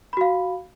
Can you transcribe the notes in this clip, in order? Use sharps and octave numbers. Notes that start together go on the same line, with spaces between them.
F#4 F5 B5